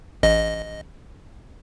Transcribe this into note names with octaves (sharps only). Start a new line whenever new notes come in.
A1 D#5